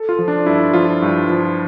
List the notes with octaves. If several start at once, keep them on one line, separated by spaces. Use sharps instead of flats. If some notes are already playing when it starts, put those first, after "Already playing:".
Already playing: A4
F4
F3
D4
G2 E4
F3 F4
G2
F3